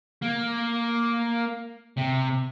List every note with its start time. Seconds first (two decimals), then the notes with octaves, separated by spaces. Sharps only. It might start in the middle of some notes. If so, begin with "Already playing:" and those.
0.22 A#3
1.97 C3